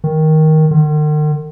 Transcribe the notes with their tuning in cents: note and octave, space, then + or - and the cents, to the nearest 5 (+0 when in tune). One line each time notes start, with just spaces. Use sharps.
D#3 +10
D#3 -45